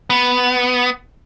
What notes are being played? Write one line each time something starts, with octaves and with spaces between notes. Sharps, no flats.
B3